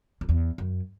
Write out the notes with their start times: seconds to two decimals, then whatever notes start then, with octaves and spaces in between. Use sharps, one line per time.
0.21 F2
0.29 E2
0.58 F#2